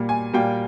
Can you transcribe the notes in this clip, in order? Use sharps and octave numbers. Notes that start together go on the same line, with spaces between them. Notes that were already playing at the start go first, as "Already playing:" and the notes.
Already playing: A#2 G3 A#3
G#5
A#2 G3 A#3 G5